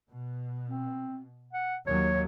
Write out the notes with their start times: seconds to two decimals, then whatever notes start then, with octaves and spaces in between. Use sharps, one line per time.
0.11 B2
0.69 C4
1.53 F#5
1.87 D#2 F#3 C#5